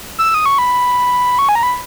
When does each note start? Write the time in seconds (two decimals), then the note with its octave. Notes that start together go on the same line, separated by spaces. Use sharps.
0.19 E6
0.34 D#6
0.46 C#6
0.58 B5
1.39 C#6
1.49 G#5
1.55 A#5
1.63 B5